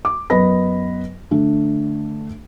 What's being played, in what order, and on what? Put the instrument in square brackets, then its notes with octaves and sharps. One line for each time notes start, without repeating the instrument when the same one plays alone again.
[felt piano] D6
F#2 B3 B4 D#5 B5 A#6
D3 A3 D4